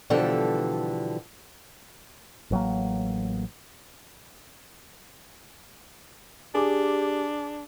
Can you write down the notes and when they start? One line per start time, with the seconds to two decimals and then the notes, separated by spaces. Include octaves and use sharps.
0.10 B2 D3 E3 F3 G3 A4
2.51 A1 F#3 A#3
6.55 D4 G4 G#4 D6